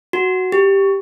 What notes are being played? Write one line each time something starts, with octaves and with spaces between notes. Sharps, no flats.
F#4
G4